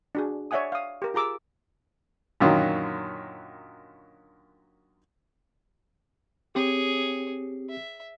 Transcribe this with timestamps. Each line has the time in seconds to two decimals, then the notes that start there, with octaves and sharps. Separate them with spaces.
0.15 D4 F#4 G#4
0.51 C#5 D5 E5 F#5 G#5 D#6
0.72 F5 D#6
1.02 G4 A#4
1.14 F4 G#4 A#5 D6 E6
2.40 F#2 A#2 D3 D#3 F#3
6.55 C4 G4 G#4 C#5
7.69 E5